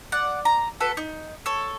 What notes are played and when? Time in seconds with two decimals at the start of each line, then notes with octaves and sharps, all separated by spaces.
0.12 D5 F#5
0.45 A#5
0.80 F#4 A4 B4
0.97 D#4
1.46 A4 C#5